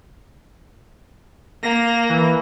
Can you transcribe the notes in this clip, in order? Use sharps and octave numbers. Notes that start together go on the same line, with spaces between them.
A#3 A#6
E3